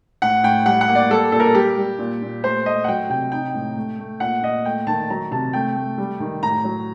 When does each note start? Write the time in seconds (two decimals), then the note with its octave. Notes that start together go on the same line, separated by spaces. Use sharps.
0.22 A2 F#5
0.43 A2 G5
0.66 G3 F#5
0.81 F#5
0.88 A#3
0.95 D5
1.10 G3 A4
1.32 A#2 A4
1.40 A#4
1.46 A4
1.54 G3 G4
1.77 G3
1.98 A#2
2.22 A#2
2.44 A3 C5
2.66 A3 D#5
2.84 F#5
2.88 F#3 G5
3.09 C3 G5
3.32 D#4 G5
3.54 A2
3.76 A3
3.99 A3
4.20 A#2 F#5
4.42 A#2 D#5
4.65 A3 G5
4.87 D#3 A5
5.10 F#3 A#5
5.31 C3 A5
5.53 A3 G5
5.76 A3
5.98 G3
6.20 D#3
6.42 A2 A#5
6.64 F#3